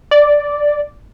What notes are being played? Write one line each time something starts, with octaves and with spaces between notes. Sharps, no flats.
D5